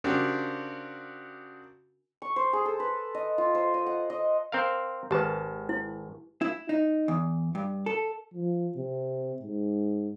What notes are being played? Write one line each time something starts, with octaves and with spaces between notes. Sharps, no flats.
C#3 C4 D4 F#4 G4 A#4
C#6
C5
G#4
A4
B4
D#5
F4
C5
D#5
F#5
D#5
C4 A#4 F5
G#1 G4 B4 A5
E4
E4
D#4
E2
G2
A4
F3
C3
G#2